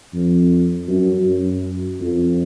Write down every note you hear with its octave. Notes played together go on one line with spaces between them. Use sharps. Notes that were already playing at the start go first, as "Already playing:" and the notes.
F2
F#2
F#2
F2